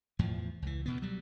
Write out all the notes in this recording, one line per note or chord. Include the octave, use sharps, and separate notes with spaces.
E2 A2 F3
C#2 E3
D2 B2 B3
F#3 G3